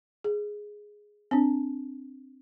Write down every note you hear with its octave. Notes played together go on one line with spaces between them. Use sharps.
G#4
C4 D4